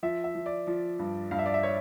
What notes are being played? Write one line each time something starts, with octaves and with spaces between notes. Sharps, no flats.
F3 E5
E5
F3
D5
F3
G2
G2 F5
E5
D5
E5
C#5